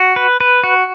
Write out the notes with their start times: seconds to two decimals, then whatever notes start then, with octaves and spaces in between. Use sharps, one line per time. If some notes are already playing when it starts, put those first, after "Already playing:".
Already playing: F#4
0.16 B4
0.41 B4
0.64 F#4